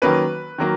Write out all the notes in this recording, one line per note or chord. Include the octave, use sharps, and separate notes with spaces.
D#3 F#3 A#3 C#4 B4
D#3 F#3 A#3